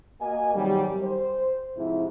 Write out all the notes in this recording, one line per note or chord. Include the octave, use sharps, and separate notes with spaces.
A#3 F#4 D#5 G#5
G#2 C3 D#3 F#3 G3
C5
G#2 C3 F3 E4